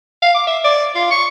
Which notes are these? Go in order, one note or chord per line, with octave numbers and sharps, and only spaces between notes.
F5
D6
E5
D5
F4
C#6